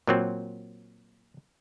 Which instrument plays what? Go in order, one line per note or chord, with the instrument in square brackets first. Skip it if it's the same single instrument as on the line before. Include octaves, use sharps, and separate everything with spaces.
[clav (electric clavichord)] A#2 F#3 C4